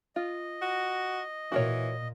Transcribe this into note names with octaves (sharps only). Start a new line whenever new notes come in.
F4 D#5
F#4
A#2 E3 F#4 A#4 C#5